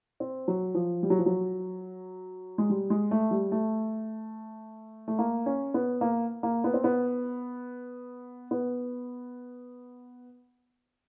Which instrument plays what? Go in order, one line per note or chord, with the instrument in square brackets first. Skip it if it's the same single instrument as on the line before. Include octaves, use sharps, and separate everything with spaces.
[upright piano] C4
F#3
F3
G3
F#3
F3
F#3
G#3
G3
G#3
A3
G3
A3
A3
A#3
C#4
B3
A#3
A#3
B3
C4
B3
B3